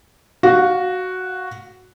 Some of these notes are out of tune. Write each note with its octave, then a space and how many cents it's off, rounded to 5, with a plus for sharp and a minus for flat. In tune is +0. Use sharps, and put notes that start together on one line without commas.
F#4 +0 F5 +20